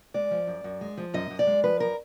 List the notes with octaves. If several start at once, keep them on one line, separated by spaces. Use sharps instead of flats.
G#3 D5
F3
F#2
F#2
G#3
F3
F#2 D#5
F#2
D5
G#3
F3 B4
F#2 A#4